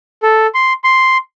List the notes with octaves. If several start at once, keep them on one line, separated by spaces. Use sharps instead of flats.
A4
C6
C6